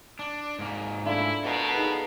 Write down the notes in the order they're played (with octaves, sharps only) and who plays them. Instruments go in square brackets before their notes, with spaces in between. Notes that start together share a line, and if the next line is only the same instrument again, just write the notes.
[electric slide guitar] D4
G#2 A#3
[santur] A3 D4 F4 [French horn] E4
[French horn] B2 [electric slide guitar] A4 A#4
[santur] D#4 G#4 B4